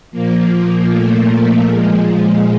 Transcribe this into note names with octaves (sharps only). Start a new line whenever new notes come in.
A#2 F3 A#3
A3
A#2 F3 G#3